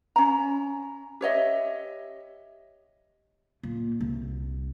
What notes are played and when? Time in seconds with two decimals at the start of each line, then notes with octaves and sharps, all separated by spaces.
0.16 C#4 A#5
1.21 G4 C#5 D#5 E5
3.63 A#2
4.01 C2